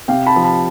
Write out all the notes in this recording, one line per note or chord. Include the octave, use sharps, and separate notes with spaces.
C3 F5 G5
A5 B5
F3
A5 B5